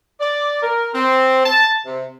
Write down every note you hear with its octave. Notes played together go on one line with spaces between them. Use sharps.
D5
A#4
C4
A5
C3